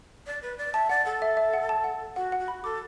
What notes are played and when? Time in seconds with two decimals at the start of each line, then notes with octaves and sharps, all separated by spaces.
0.27 D5
0.43 B4
0.58 D5
0.74 E5 A5
0.89 D5 F#5
1.06 A4 F#5
1.22 E5
1.37 E5
1.54 F#5
1.69 A5
1.84 F#5
2.16 F#4 F#5
2.32 F#5
2.40 F#4
2.48 B5
2.64 A4 D6